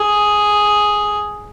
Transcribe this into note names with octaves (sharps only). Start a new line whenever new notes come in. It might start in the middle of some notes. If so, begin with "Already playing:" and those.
Already playing: G#4